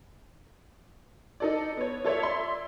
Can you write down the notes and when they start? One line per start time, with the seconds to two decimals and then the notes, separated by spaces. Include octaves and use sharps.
1.40 D#4 A4 D5
1.77 B3 C#5
2.04 F4 A4 C#5 D5 E5
2.22 D5 E5 C6